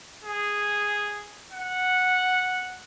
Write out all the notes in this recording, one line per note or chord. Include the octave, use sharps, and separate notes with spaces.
G#4
F#5